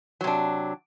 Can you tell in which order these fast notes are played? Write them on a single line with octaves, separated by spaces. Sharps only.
F#3 C3 D4